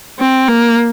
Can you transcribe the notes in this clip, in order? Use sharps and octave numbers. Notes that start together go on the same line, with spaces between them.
C4
A#3